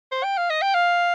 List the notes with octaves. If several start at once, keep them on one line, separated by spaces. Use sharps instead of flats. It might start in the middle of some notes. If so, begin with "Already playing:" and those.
C5
G5
F5
D#5
G5
F5